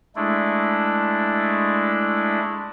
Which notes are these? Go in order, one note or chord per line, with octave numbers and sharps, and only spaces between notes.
G#3 A3 D4 E4